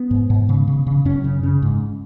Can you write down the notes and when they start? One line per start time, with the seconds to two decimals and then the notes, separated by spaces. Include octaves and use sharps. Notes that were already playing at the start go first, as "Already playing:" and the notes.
Already playing: B3
0.11 G#2
0.30 G#2
0.49 C#3
0.67 C#3
0.87 C#3
1.05 F#2 C#4
1.24 C#3
1.43 C#3
1.62 G#2